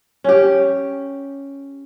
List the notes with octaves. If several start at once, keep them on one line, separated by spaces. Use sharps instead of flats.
C#4 G4